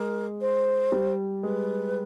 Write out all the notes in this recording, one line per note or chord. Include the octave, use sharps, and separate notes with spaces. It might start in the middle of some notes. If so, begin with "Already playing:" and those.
Already playing: G#3 A#4
C5
G3
G#3 B4